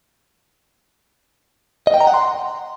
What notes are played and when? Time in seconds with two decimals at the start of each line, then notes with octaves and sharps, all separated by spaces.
1.87 D#5
1.94 G5
2.00 A#5
2.07 F#5
2.14 C6